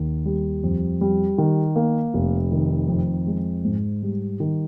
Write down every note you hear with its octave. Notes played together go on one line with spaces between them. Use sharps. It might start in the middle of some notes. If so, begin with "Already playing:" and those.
Already playing: D#2 D#3
G3
F2
G3
D#3
A#3
F1
D#3
F2
G#3
G#2
G3
D#3